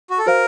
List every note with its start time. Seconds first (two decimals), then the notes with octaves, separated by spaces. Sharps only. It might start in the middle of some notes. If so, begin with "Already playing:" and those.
0.10 F#4
0.18 A4
0.26 F#4 A#4 C5 F5